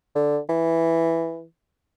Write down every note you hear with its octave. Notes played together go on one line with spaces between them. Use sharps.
D3
E3